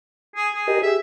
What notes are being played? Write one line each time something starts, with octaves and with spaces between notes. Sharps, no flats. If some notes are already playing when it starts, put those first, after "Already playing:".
G#4
G#4
G4 A#4 D#5
G4 G#4 E5